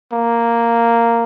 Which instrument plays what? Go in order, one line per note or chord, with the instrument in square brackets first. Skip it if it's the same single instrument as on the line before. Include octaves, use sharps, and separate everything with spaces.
[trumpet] A#3